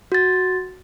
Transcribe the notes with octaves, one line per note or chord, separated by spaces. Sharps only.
F#4 A6